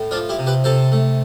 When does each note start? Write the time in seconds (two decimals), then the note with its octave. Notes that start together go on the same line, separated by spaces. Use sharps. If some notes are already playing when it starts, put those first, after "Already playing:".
Already playing: A2
0.11 F3 D4 F4
0.29 E4 G4
0.39 C3
0.46 G4 B4
0.64 C3 A4 C5
0.92 A3